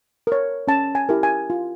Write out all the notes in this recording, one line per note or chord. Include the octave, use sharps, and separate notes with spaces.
A#4 C#5
C#4 A5
G#5
E4 G4 A#4
G#5
F4